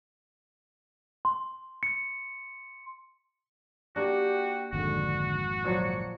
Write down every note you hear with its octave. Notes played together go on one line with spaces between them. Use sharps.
C6
C#7
A#3 D4 F#4 G4
G#1 F2 G#2 D3 F#4
A#2 F3 F#3 C#7